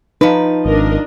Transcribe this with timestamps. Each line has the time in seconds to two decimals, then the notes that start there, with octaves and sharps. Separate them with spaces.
0.21 F3 D#4 B4
0.65 G#1 D4 A#4 D#5